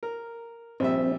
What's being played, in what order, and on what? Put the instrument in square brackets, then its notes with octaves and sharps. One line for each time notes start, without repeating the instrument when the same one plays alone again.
[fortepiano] A#4
[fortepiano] A#1 G3 E5 [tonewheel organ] C4